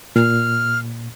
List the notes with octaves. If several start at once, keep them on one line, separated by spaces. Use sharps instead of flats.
A#2 F6